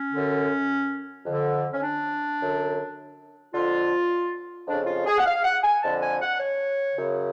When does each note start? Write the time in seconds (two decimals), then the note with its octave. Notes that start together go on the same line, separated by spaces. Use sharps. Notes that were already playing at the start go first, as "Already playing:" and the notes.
Already playing: C#4
0.12 F#2 D3
1.25 F2 D3
1.72 C#4
1.83 D4
2.40 F#2 D3
3.53 F2 D3 F4
4.67 F2 C#3 D4
4.87 F4
5.06 G#4
5.18 F#5
5.25 F5
5.43 F#5
5.63 G#5
5.82 F2 D3 A5
6.01 G#5
6.20 F#5
6.39 C#5
6.96 F#2 C#3